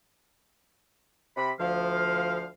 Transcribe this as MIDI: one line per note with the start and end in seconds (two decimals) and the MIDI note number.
1.36 1.51 48
1.36 1.51 83
1.59 2.48 38
1.59 2.48 53
1.59 2.48 77